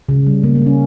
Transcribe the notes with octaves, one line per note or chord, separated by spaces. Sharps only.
C#3
G3
C#3 A#3
A#3
C#3 C#4